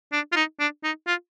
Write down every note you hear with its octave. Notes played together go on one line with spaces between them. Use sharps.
D4
F4
D#4
D4
D#4
F4